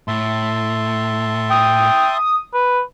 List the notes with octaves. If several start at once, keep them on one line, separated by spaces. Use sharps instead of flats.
A2 E5 A5 C6
G5 D#6
B4